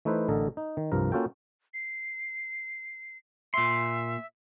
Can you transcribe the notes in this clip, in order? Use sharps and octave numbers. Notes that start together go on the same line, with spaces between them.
E3 A3 D#4 E4 B4 C5
A1 D3 A4 A#4 D#5
D#4
D#3
C2 G2 F3 A#4
A#3 C#4 F4 F#4 A4 G5
C7
A#2 E5 C6